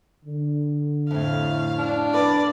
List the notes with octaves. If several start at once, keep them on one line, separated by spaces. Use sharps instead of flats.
D3
F2 A2 F5
D4
B3 B4 D5